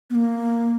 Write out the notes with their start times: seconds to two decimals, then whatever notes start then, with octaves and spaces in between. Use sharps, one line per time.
0.10 B3
0.15 A#3